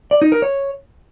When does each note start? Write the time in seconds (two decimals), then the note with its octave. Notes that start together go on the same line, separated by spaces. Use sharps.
0.11 D5
0.22 D#4
0.32 A#4
0.42 C#5